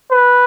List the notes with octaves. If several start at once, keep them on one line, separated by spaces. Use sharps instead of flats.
B4